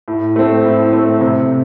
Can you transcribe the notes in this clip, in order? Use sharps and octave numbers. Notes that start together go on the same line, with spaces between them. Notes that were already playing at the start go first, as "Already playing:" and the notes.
A2
A3 C4
A2
A3 C4
C3